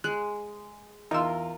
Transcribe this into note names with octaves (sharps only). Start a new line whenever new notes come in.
G#3 F#6
E2 D#4 F4 A#4 C6 E6